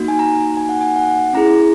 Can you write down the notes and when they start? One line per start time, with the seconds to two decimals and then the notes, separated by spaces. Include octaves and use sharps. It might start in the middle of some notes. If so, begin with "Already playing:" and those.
Already playing: A#3 D#4 F#4
0.08 G#5
0.19 A#5
0.57 G#5
0.69 F#5
0.81 G#5
0.96 F#5
1.33 C#4 E4 G#4 A#5